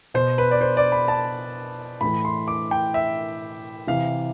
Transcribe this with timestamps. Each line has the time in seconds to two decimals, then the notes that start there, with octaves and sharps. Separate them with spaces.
0.14 B2 C5
0.38 B4
0.51 D5
0.61 C5
0.77 D5
0.92 B5
1.08 A5
2.01 A2 E3 B5
2.25 C6
2.48 D6
2.71 G5
2.94 E5
3.87 C3 E3 F5